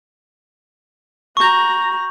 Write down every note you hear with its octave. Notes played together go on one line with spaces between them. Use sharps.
F#4 A#5 C#6 G6